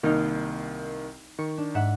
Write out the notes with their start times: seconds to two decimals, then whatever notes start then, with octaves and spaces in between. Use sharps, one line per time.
0.03 C2 D#3 A#3 D#4 F6
1.39 D#3 C#6
1.58 D4
1.74 G#2 E5 F#5